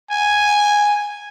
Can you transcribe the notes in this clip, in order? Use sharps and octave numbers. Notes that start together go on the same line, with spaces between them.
G#5